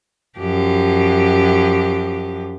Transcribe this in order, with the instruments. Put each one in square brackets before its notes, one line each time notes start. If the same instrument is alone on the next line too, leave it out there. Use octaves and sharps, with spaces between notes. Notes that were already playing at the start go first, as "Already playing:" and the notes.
[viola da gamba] F#2 F3 G4